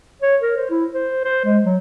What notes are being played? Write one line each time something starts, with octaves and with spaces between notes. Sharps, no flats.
C#5
A#4
C5
E4
C5
C5
G#3
F#3